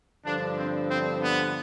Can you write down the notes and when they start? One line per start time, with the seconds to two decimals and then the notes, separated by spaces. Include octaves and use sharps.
0.25 G2 D3 F3 D4
0.58 C4
0.90 C4
1.22 B3